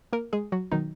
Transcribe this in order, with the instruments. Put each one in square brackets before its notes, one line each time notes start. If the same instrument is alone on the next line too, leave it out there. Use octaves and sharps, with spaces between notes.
[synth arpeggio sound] A#3 A#4
G#3 G#4
F#3 F#4
B2 D#3 F#3 D#4